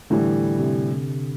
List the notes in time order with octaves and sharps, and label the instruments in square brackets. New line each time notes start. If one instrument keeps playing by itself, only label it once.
[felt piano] A2 E3 G3 [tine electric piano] D3
[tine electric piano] C3